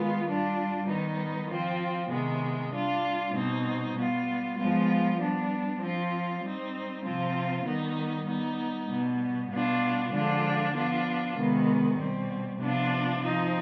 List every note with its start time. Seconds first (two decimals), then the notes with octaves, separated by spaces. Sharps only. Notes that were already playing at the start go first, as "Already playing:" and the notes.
Already playing: D#3 G#3 B3 F4
0.26 G3 D4 F4
0.87 D#3 G3 B3 D#4
1.50 F3 C4 F4
2.11 C3 D#3 G#3 B3
2.72 G3 D4 F4
3.34 B2 G3 C4 D#4
3.96 G3 B3 F4
4.57 F3 G#3 B3 F4
5.20 G3 B3 D4
5.81 F3 C4 F4
6.43 G3 C4 D#4
7.05 C3 F3 C4 F4
7.66 D#3 G3 B3 D#4
8.28 G3 B3 D#4
8.90 B2 G3 B3
9.52 B2 G3 B3 D4 F4
10.13 D3 F3 G#3 D4 F4
10.75 F3 B3 D4 F4
11.37 C3 D#3 G#3 B3
11.98 B2 G3 C4
12.60 C3 F3 B3 D4 F4
13.22 F3 C4 D#4